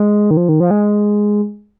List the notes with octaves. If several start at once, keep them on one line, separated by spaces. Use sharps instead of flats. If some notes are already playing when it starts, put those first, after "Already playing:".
Already playing: G#3
D#3
F3
D#3
F3
G#3